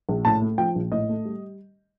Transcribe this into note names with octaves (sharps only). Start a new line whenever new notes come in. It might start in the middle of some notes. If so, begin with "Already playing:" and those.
A#1
A2 A5
A3
F3 G5
A#1
A2 D#5
A3
G3